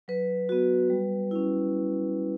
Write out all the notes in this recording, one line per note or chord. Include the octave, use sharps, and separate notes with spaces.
F#3 B4
B3 F#4
G3
C#4 E4